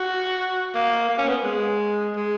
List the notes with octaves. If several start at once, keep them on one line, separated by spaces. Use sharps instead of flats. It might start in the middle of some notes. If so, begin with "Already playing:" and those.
Already playing: F#4
A#3
A#3
C#4
B3
G#3
G#3